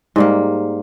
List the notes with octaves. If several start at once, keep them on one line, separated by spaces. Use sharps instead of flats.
G#2 G3 A#3